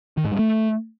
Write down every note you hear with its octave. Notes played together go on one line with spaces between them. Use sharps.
D#3
G#2
G2
A3